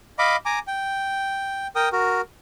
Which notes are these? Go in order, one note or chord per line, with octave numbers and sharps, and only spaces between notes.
D#5 F5 B5 D6
G#5 A#5 D6
G5
A#4 G5 D#6
F#4 A#4